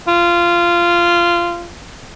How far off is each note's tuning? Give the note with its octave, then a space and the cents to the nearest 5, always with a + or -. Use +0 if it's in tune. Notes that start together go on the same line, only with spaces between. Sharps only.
F4 -15